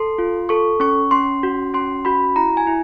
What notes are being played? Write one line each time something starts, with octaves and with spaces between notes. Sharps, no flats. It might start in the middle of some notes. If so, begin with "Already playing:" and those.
Already playing: A4 C6
F4
A4 C#6
C#4 C#6
C#4 C6
F#4
C#4 C6
F#4 B5
E4 A#5
G#5
E4